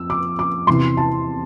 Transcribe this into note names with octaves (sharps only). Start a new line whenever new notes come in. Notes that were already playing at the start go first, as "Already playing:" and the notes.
Already playing: F2 E6
D6
D6
E2 C3 E3 C6
A5